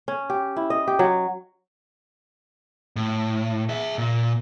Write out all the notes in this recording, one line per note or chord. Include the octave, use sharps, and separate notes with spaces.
C#4
G4
E4
D#5
G4
F#3
A2
G#4 E5
A#2